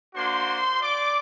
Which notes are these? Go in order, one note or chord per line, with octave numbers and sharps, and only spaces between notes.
A#3 D4 F#4 C5 C6
D5 D6